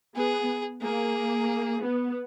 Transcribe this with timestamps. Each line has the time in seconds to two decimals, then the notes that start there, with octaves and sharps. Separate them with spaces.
0.16 B3 G#4
0.82 A#3 G#4
1.83 B3